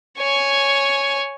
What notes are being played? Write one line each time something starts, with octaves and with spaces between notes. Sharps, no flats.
C#5 G#5